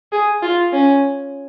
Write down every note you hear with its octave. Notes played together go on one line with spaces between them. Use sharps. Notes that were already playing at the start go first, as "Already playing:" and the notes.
G#4
F4
C#4